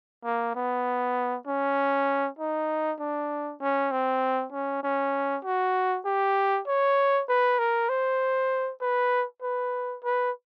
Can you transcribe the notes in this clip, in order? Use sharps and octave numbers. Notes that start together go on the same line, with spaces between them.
A#3
B3
C#4
D#4
D4
C#4
C4
C#4
C#4
F#4
G4
C#5
B4
A#4
C5
B4
B4
B4